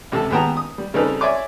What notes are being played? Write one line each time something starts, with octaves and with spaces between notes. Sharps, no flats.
C#2 C3 A4 A5
D#2 G#3 B3 G5 A5 A#5
D#6
G3
C#3 G3 C4 D#4 A4 B4
C#5 D5 E5 G#5 C6 D6